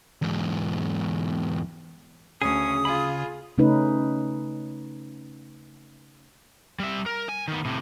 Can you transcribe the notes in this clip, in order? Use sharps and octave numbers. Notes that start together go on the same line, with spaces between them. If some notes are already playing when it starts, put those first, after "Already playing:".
E2 G#2
D2 C#3 C#4 G#4 D#6
F4 G#4 B5
C#3 A3 C#4 D#4 B4
G3 E5
A#4
G#5
D#3 B3
A2 C3